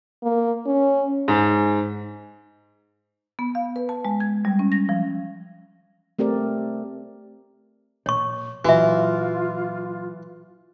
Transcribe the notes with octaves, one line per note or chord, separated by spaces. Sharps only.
A#3
C#4
G#2
B3
F5
B4
A5
G#3
G#6
G3
C#4
A#6
F3
A3 C4 G4 A#4 D5
A#2 C#5 C#6
A#2 E3 F#3 F4 F#4 E5